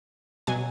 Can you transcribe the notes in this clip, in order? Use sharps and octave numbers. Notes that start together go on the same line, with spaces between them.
B2 F#3 G#5